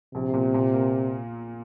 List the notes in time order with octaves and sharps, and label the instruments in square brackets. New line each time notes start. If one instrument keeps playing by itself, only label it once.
[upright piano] A#1 [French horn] C3
[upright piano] A#2
A#2
A#3